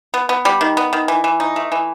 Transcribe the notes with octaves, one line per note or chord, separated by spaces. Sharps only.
B3
B3
G3
D#3
B3
D#3
E3
E3
D#4
A3
E3